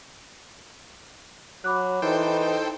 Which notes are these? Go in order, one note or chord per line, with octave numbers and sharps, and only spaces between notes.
F#3 B5 D6 F#6
E3 D#4 A4 C5 G5